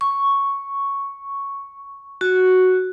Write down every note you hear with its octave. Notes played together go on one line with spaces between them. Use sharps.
C#6
F#4